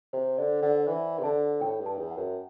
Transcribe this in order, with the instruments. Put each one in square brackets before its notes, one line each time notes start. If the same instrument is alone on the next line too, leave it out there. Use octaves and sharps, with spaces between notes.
[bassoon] C3 [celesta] C5
[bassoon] D3 [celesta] D5
[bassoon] D3 [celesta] F#5
[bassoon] E3
C3
[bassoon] D3 [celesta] A5
[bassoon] A2 [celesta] G5
[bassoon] G2
[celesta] A5
[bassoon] E2
[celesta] F#5
[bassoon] F#2